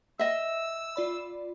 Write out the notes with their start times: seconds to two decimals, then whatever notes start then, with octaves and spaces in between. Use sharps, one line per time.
0.19 D#5 E5 E6
0.96 F4 D5 B5